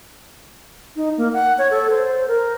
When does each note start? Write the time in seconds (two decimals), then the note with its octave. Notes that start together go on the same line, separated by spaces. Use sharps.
0.96 D#4
1.17 A#3
1.33 F#5
1.58 C#5
1.71 A4
1.90 C5
2.28 A#4